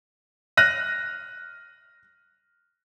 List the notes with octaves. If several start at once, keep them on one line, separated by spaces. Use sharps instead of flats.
F6 F#6 A#6 D#7